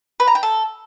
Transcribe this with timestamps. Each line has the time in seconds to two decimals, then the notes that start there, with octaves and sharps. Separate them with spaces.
0.20 B4
0.27 A#5
0.35 G5
0.43 A4